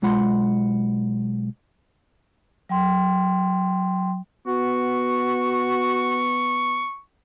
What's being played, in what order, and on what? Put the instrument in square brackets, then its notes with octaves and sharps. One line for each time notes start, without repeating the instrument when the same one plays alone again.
[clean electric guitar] B1 G#3 F4 F#5 B5 C6
[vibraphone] F#3 G5 C6
[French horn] B3 [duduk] F#4 [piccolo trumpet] C#6